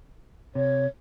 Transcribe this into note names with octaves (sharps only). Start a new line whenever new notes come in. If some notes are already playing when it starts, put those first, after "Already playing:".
C3 C#5